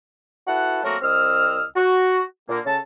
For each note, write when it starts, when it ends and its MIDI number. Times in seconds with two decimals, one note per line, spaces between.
0.47 0.80 64
0.47 0.80 66
0.47 0.80 69
0.47 0.80 71
0.47 0.80 78
0.84 0.96 54
0.84 0.96 57
0.84 0.96 58
0.84 0.96 60
0.84 0.96 66
0.84 0.96 70
1.02 1.63 36
1.02 1.63 60
1.02 1.63 75
1.02 1.63 88
1.02 1.63 89
1.76 2.22 66
2.49 2.59 46
2.49 2.59 50
2.49 2.59 58
2.65 2.79 49
2.65 2.79 61
2.65 2.79 69
2.65 2.79 81